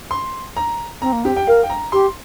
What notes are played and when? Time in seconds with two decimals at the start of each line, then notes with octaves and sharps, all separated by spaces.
0.11 C6
0.57 A#5
1.02 C4 A#5
1.13 A#3
1.25 C4 G4
1.36 G5
1.47 A#4 F5
1.63 G5
1.70 A#5
1.92 G4 C6